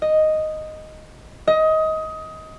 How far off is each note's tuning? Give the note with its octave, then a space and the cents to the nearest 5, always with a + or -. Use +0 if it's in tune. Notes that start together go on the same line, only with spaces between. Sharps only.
D#5 +0
D#5 +20